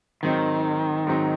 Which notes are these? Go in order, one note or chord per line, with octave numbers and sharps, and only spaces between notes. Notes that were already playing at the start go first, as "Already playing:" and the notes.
G#2 D#3 F#3 C4 D#4
G#2 F#3 C4 D#4